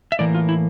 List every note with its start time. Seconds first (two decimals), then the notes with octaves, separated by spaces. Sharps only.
0.12 E5
0.19 A2 E3 A#3 D5
0.34 F4
0.49 E4